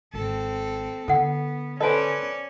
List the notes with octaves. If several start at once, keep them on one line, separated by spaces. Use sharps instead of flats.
G#1 C4 A4
D3 B3 A4 F#5
C#4 A4 B4 C5 D5 D#5 G#5